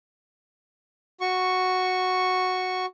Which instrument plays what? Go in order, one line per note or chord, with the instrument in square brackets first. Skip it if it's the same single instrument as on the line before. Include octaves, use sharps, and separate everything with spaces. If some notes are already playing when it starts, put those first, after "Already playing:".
[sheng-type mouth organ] F#4 C#6